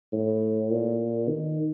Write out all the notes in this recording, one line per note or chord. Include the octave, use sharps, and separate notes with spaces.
A2
A#2
D#3